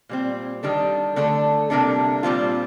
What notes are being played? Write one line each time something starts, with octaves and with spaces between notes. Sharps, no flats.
A#2 G3 C4
D#3 G3 D4 A4
D3 A3 D4 A4
C3 G3 A#3 D4 A4
A#2 G3 C4 F4